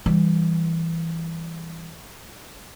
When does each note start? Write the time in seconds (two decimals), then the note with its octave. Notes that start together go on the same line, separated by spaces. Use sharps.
0.06 E3 G3